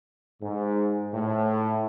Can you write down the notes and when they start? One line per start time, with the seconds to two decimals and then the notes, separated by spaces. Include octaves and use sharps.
0.42 G#2
1.14 A2